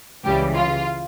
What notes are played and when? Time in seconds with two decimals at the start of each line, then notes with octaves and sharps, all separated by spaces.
0.25 C#2 C#3 E3 G3 G4
0.54 F4